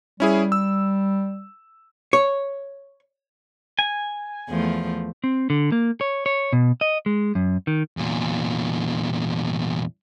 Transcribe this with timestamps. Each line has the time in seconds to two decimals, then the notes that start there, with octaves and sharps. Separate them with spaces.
0.20 G3 C#4 E4 G#4
0.52 E6
2.13 C#5
3.79 G#5
4.49 E2 F3 A3
5.24 C4
5.50 D3
5.72 A#3
6.01 C#5
6.26 C#5
6.53 B2
6.81 D#5
7.06 G#3
7.35 F#2
7.67 D#3
7.97 E2 A#2